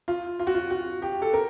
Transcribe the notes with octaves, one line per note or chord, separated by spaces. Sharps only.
F4
F4
F#4
F4
F#4
G4
A4
A#4